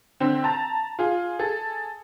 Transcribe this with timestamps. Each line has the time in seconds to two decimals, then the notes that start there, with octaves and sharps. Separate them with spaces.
0.20 D3 C4
0.44 A5 A#5
0.99 F4 G#4
1.39 G#4 A4